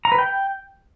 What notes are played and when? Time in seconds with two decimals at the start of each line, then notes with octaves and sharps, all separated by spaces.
0.05 A#5
0.12 B4
0.19 G5